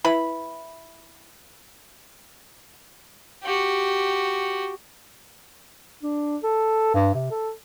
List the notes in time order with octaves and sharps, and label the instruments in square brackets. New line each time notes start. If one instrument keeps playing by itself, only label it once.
[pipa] E4 B4 B5
[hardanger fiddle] F#4 G4
[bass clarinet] D4
A4
G2
C3
A4